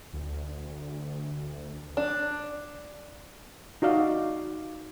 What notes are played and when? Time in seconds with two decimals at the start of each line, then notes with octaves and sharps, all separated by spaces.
0.13 D2
1.97 D4
3.82 D#4 F#4 D5 F5